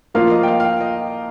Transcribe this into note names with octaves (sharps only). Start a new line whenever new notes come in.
F3 A#3 F4 F5
D#5
G5
F5
F5
G5
D#5